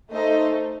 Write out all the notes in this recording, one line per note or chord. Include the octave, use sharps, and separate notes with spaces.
A3 D#4 A4 C5 D#5